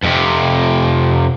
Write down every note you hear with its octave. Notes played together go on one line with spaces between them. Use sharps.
F2 C3